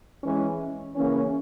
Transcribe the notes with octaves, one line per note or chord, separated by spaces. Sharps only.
E3 G#3 C#4
C#3 E3 A#3 C#4